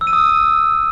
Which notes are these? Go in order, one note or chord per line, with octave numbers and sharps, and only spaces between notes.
E6
D#7
D#6